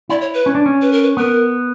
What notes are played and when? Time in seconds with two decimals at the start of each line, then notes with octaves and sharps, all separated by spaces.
0.09 E4 D5
0.21 C#5
0.34 B4
0.46 C#4
0.55 D4
0.66 C#4
0.82 B4
0.92 A#4
1.03 B4
1.17 B3 A#4